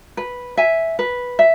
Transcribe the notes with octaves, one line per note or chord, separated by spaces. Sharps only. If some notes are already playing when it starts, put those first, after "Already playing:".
B4
E5 G#5
B4
E5